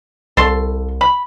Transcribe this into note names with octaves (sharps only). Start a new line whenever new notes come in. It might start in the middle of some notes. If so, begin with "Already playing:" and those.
C2 A4 C6
B5